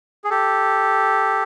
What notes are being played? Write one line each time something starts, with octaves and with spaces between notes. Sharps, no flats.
G#4
G4 A4